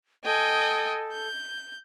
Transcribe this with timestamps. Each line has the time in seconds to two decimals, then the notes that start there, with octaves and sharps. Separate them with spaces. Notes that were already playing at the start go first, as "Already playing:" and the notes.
0.25 A4 D#5 G5 G#5
1.11 G6